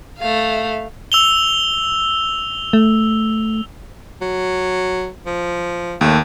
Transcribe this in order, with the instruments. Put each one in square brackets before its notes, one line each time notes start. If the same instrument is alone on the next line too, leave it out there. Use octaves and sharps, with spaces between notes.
[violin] A3 F5
[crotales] E6 F7 G7
[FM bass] A3
[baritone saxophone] F#3
F3
[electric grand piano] D#2 [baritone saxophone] A3